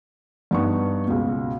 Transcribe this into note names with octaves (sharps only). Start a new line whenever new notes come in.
G2 B3 D#4 C#6
C#2 B2